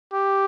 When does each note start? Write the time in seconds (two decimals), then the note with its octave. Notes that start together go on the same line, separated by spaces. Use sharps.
0.14 G4